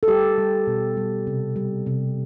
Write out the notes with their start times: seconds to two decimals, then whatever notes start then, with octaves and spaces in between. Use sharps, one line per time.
0.03 A4
0.08 G3 G4
0.38 G3
0.67 B2
0.97 G3
1.27 C3
1.56 G3
1.86 C3